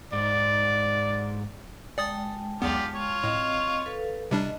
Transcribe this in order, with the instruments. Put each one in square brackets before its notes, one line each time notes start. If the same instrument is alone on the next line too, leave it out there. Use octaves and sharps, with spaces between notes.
[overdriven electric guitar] G#2 [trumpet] D5
[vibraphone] G#3 G5 A5 [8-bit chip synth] D5 D#6 A6
[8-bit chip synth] B1 E2 B3 [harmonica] F4 G4 D5
[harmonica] F4 C#5
[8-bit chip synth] A2 [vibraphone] C4 D#5
[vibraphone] A4 B4 F5
[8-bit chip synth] C3 G3 D4 [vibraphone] D5 D#5